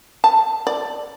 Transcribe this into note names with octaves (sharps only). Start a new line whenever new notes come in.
A5
D5